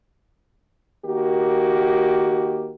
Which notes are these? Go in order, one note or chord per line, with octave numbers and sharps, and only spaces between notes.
D#3 A#3 F#4 G4